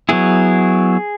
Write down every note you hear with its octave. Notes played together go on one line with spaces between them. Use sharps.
F#3 B3 E4 G#4